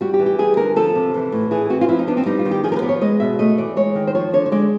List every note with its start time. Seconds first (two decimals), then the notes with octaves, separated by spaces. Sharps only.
0.01 G3 F#4
0.14 G4
0.19 E3
0.26 G4
0.39 G3 G#4
0.57 D3 A#4
0.76 F3 A4
0.95 C3
1.14 E3
1.32 A2
1.51 E3 G#4
1.70 C4 F#4
1.81 F4
1.89 F3 E4
1.99 D#4
2.07 B3 D4
2.17 C4
2.26 G3 D#4
2.39 F4
2.45 D#3
2.51 G4
2.64 F3 G#4
2.72 A#4
2.76 B4
2.82 B3 D5
2.89 C#5
3.01 G#3 D#5
3.20 B2 E5
3.39 A3 D#5
3.58 E3 D5
3.76 G#3 C#5
3.95 D#3
4.07 C5
4.15 F3 C#5
4.33 D3 C#5
4.46 C#5
4.52 G#3 D5